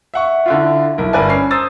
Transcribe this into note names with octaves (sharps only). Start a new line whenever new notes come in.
E5 F#5 C#6
D3 E4 F4
B1 E4 A#4
G1 A#4 B4 D5 G#5 A5
C#4 C7
C5 A#5 D#6 E6 A6